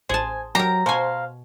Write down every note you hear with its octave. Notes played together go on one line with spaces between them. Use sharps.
A1 G#4 C5 G#5 A5
F#3 G4 A#4 A#5
B2 C5 F5 G#5